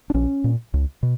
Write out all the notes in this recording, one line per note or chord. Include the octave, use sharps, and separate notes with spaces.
D4
A#1 C#4
A#2
C#2
B2